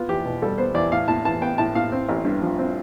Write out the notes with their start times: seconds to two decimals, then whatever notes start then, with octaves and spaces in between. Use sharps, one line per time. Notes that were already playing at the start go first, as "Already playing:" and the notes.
Already playing: B3 F4
0.09 E2 G4
0.25 B2
0.42 G3 A4
0.58 B3 C5
0.74 E2 D5
0.92 A2 F5
1.08 A2 A5
1.25 E3 A5
1.41 B3 G5
1.58 A2 A5
1.75 A2 F5
1.92 C4
2.09 A1
2.25 G2
2.42 F3
2.59 C4